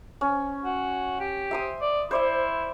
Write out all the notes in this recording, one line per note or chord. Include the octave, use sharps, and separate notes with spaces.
C#4
F#4
G4
E5 C6 D#6
D5
E4 C5 D5 E5